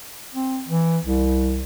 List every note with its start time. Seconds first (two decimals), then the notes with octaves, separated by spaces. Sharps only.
0.34 C4
0.69 E3
1.05 C2